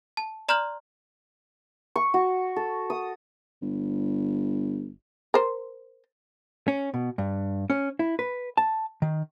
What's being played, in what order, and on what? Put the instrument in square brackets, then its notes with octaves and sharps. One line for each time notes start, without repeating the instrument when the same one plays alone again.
[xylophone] A5
D5 A#5 C6 F6 G6 F#7
[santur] C#6
F#4
A4
D#6
[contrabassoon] G1
[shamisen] A#4 C5
[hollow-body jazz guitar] C#4
B2
G2
C#4
E4
B4
A5
D#3